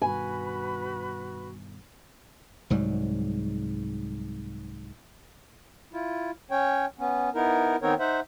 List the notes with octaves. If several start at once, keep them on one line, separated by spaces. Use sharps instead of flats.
G2 B2 D#3 F#4 B4 G#5 B5
C2 G#2 F#3 G3
E4 F4
C#4 C#5 G5
B3 C#4
B3 D#4 E4 A#4
D#3 B3 C4 D#4 A#4 C#5
D#4 C5 E5 F#5